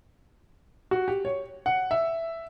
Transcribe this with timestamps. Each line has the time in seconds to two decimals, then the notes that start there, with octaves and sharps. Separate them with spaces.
0.91 F#4
1.08 G4
1.25 C#5
1.66 F#5
1.91 E5